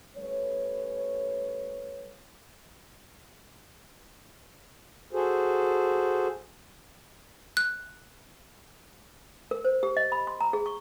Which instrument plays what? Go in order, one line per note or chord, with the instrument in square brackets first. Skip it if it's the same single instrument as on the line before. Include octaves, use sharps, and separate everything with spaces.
[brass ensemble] G3 A3 C#4 B4 C#5
[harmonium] F#4 G#4 A4 C5
[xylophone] F#6
[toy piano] A#4
C5
G4
D#5
B5
C6
A#5
G#4
C#6